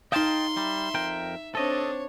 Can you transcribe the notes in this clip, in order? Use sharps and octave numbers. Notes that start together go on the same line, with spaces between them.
D#4 D#5 F5 G5 A5 C6
G3 E5
F2 A#4 G5
C4 D4 A4 C#5 D#5